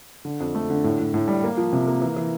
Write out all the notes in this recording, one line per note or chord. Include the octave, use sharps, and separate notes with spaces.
D3
F2
A3
D3
A2
A2
A2
G3
A#3
F3
C3
A#3
E3
E3